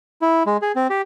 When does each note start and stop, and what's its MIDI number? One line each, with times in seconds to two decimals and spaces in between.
0.22 0.43 64
0.46 0.57 56
0.62 0.72 68
0.76 0.87 60
0.90 1.02 67